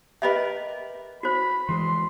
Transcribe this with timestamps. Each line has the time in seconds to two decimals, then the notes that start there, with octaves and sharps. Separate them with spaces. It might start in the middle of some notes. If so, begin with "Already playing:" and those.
0.22 G4 A#4 B4 D#5 E5
1.23 F#4 C5 B5
1.69 E3 G#3 C6